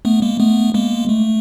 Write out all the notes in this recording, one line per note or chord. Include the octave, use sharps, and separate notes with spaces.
A3 B3
G#3 A#3
A3 B3
G#3 A#3
A3